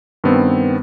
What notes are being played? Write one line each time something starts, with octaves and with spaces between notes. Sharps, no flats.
G2 D#3 B3 C4